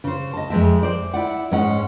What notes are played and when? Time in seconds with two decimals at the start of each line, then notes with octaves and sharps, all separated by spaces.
0.04 C#3 C5
0.33 D#5 A5
0.50 F2 G#3 C4 E5
0.83 C5 D5
1.13 E4 D5 F#5
1.51 G#2 G#3 C#4 F#5